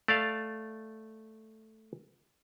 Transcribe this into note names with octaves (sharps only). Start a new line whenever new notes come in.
A3 D5 F5